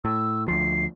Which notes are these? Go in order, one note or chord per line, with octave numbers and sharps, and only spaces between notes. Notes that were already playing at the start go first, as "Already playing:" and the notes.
A2 E6
D2 F3 C7